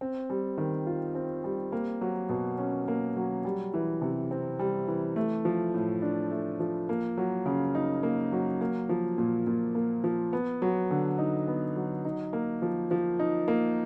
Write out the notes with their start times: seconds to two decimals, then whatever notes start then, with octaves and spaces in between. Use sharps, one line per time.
0.01 C4
0.30 G3
0.58 D#3
0.87 F4
1.15 C4
1.44 G3
1.72 A#3
2.01 F#3
2.29 B2
2.58 C#4
2.88 A#3
3.17 F#3
3.45 G3
3.74 E3
4.02 C3
4.31 C4
4.59 G3
4.88 E3
5.16 A3
5.45 F3
5.74 A2
6.02 D4
6.31 A3
6.60 F3
6.89 A#3
7.18 F#3
7.46 C#3
7.75 D#4
8.03 A#3
8.32 F#3
8.61 A#3
8.89 F3
9.18 A#2
9.47 A#2
9.75 A#3
10.04 F3
10.33 B3
10.62 F#3
10.91 D3
11.18 D#4
11.48 B3
11.76 F#3
12.05 D#4
12.33 A#3
12.62 F3
12.91 F3
13.19 D#4
13.48 A#3